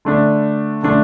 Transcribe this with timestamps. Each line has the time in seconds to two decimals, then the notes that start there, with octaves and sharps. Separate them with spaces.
0.05 D3 A3 D4
0.83 D3 A3 D4